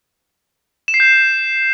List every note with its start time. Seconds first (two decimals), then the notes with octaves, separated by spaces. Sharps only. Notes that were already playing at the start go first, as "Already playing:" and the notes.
0.88 E7
0.94 C7
1.00 G6